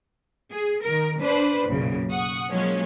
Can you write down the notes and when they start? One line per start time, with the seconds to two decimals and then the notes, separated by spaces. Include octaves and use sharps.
0.52 G#4
0.83 D#3 A#4
1.22 D4 B4 C5 D5 B5
1.68 B1 F#2 A#2 C#3
2.12 F#5 C#6 D#6
2.51 F3 F#3 G#3 A#3 C#4